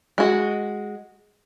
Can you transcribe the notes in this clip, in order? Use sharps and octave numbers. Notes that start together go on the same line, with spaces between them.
G#3 F#4